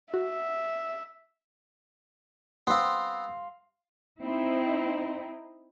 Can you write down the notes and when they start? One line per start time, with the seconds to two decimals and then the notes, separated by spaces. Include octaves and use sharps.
0.14 F#4 E5
2.67 B3 C4 F5 C6
4.22 C4 D#4 E4